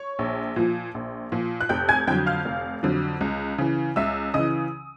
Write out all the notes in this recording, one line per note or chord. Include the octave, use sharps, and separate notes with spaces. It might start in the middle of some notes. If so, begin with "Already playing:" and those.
Already playing: C#5 C#6
A#1
A#2 F3
A#1
A#2 F3
F#6
F1 G5 G6
G#5 G#6
F2 D3 F#3 G5 G6
F5 F6
F1
F2 D3 F#3
C#2
C#3 E3
C#2 E5 E6
C#3 E3 D#5 D#6